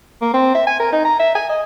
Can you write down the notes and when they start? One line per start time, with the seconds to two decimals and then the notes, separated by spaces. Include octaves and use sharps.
0.21 A#3
0.34 C4
0.55 E5
0.67 G#5
0.79 A#4
0.92 D#4
1.05 A#5
1.19 E5
1.35 G#5
1.50 D#5